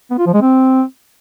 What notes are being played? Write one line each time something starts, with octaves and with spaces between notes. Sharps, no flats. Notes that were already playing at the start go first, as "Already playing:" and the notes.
B3
F4
F3
G#3
C4